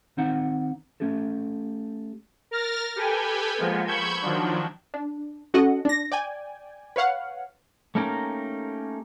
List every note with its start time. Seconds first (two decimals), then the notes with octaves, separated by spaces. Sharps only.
0.17 D#3 C4 D#4 F#5
1.00 A3 C#4 G4 A4
2.51 A#4 F6 A6 A#6
2.96 G4 A4 B4 G5 G#5
3.58 F3 G#3 A#3 B3
3.87 B5 C#6 E6 G6 G#6
4.22 D#3 F3 F#3 D4
4.94 D4
5.54 C#4 F#4 A4 D#5 F#5
5.85 D4 A#6
6.12 D5 G5 G#5
6.96 B4 C#5 F5 F#5
7.95 A3 A#3 C#4 D#4 G4 A#4